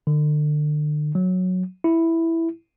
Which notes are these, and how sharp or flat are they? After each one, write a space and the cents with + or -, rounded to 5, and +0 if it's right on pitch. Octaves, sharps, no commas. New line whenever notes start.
D3 +35
F#3 -10
E4 +0